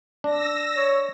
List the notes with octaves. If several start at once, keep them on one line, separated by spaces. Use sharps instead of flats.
D4 E6 A#6
C#5